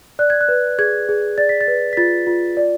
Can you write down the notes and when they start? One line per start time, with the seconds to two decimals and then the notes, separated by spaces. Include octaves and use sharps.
0.19 D5 F#6
0.30 G#6
0.41 F#6
0.48 B4
0.79 G#4 G#6
1.09 G#4
1.38 D5 A6
1.49 B6
1.61 A6
1.68 B4
1.93 B6
1.97 F4 A6
2.27 F4
2.57 D5